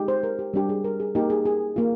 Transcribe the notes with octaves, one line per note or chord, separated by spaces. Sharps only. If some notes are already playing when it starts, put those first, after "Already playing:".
Already playing: G#3 D#4 G4
C5
A#4
G4
G3 D4 G4
G#4
A#4
G#4
A#3 D#4 G4 A#4
G#4
G#4
A#3 F4